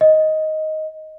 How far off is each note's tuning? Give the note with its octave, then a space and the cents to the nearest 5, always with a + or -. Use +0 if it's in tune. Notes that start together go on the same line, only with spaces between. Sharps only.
D#5 +5